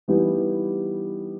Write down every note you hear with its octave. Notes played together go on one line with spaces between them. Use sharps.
E3 G3 B3 D#4 G4